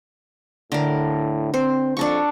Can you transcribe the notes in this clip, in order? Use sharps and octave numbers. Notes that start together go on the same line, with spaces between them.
A2 D3 A#4
C4 C5
F2 D4 A4 C#6